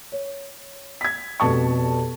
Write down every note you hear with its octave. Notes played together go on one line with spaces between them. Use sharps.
C#5
G#6 B6
F1 B2 A5 C#6